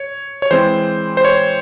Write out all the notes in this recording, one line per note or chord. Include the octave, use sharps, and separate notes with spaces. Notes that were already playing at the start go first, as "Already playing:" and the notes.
Already playing: C#5
C#5
E3 G#3 C4 C5
C5
C#5